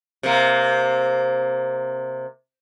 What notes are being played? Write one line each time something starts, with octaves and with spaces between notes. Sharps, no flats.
C3 A#3